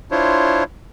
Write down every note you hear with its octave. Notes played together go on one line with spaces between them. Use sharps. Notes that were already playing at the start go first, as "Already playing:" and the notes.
D4 E4 F4 C5 C#5